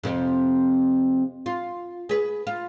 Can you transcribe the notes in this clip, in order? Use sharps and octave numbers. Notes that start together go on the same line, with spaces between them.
F2 C3
F4
G#4 B4
F4